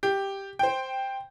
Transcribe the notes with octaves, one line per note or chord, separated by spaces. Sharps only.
G4
C5 G5